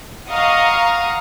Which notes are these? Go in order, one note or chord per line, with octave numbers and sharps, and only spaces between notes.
D#5 F5 F#5 A#5 C#6 D#6